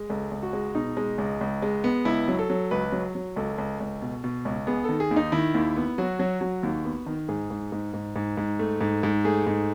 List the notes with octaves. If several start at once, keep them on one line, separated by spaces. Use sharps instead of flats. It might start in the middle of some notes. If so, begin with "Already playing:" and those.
Already playing: G#3
C#2 A4
C#2
F#4
G#3
B2 D#4
G#3
C#2
C#2
G#3
B3
C#2 E4
F#3
A4
F#3
C#2 B4
F#3
F#3
C#2 A4
C#2
C#2
B2
B2
C#2
B3 G#4
D#3 A4
G#4
D#2
D#4
D#3 E4
D#2
B3
F#3 F#4
F#3
F#3
D#2
B3
D#3
G#2 G#4
G#2
G#2
G#2
G#2
G#2
A3
G#2
G#2
A3 G#4
G#2